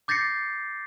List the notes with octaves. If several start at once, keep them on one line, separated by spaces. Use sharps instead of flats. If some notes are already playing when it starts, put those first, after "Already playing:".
D6 G6 A6 A#6 C7 C#7